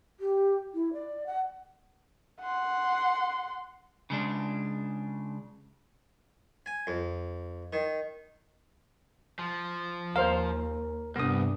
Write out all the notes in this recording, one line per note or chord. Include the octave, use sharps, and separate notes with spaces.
G4
E4
D5
F#5
F#5 C6
C#3 G#3 D4
G#5
F2
D#3
F3
D#2 A#4 C5 F5
C2 G2 B3 D4 D#6